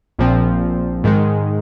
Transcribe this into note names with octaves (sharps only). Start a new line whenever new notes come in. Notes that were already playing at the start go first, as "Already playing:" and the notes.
A#1 A#2 F3 C4
G#2 D#3 G#3